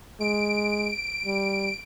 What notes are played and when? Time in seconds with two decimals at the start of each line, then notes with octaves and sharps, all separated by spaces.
0.21 G#3 D7
1.26 G3